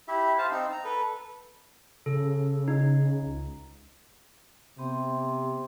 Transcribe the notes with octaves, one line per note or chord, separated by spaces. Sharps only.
E4 G4 E5
C5 F5 A5
C4 D#4
A#5
A4 B4
C#3 A4
D#4
C#2
C3 B3 G4 C6